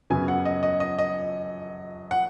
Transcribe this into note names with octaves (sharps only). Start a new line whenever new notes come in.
F#2 C#3 F#3 B3 G#5
F#5
D#5
D#5
D#5
D#5
F#5